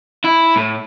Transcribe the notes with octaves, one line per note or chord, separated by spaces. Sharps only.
E4
A2